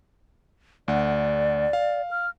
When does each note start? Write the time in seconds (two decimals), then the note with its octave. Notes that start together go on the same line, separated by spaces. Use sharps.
0.88 D2 D5 F#5
1.73 F5
2.11 F6